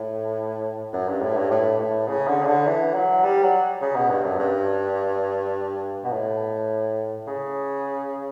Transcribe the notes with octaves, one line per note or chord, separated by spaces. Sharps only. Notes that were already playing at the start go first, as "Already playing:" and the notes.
Already playing: A2
F#2
G2
A2
G2
A2
A2
C#3
D3
C#3
D3
E3
F#3
G3
F#3
C#3
B2
G2
F#2
G2
B2
A2
C#3